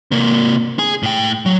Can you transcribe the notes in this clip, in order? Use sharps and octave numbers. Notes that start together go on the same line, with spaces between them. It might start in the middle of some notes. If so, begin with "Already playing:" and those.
C3 A#3
G#4 G#5
A2 G5
F#3